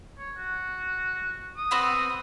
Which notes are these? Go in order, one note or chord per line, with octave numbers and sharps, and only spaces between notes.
C#5
F#4
D#6
B3 C4 F#4